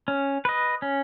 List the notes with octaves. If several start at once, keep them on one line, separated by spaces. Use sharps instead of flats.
C#4
B4 D#5
C#4